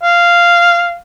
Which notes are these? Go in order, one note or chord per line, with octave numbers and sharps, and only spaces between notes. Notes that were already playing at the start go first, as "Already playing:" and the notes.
F5